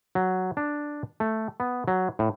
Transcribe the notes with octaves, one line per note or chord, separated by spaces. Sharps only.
F#3
D4
A3
B3
F#3
A2